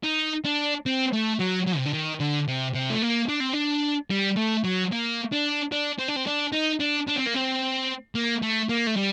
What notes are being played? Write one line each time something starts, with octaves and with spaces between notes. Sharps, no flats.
D#4
D4
C4
A3
F#3
F#3
C3
D3
D#3
D3
C3
C3
A3
A#3
D4
C4
D4
G3
A3
F#3
A#3
D4
D4
C4
D4
C4
D4
D#4
D4
D4
C4
A#3
C4
A#3
A3
A#3
A3
G3